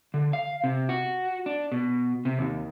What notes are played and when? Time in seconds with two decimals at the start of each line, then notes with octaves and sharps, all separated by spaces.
0.14 D3
0.33 F5
0.64 C3
0.89 F#4
1.46 D4
1.72 B2
2.25 C3
2.39 D#2